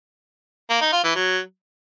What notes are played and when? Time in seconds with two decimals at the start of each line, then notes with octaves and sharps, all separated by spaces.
0.70 A#3
0.81 D#4
0.93 F4
1.04 E3
1.15 F#3